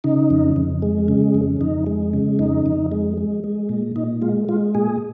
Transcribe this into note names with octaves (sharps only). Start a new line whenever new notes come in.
C#3 D#4
F2
F2
G#3
C#3
F2
F2 D#4
G#3
C#3
F2 D#4
F2
G#3
G#3
G#3
A#2
A#2 D#4
G#3 F4
G#3 F4
A#2 G#4